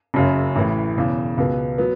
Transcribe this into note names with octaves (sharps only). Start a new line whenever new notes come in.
F#1 F#2 C#3
A1 A2 E3
E1 E2 C#3
C#2 B2 B3
F#3 B3